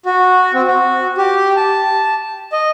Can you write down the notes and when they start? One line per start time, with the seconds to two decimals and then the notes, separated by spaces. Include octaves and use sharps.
0.06 F#4
0.54 C4
0.67 F#4
1.18 G4
1.57 A5
2.52 D#5